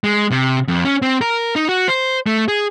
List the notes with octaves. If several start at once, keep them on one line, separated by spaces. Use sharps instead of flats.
G#3
C3
F2
C#4
C4
A#4
D#4
F#4
C5
A3
G#4